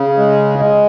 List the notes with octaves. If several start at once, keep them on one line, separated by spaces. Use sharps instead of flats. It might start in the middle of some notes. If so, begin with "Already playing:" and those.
Already playing: C#3
G#3
G#3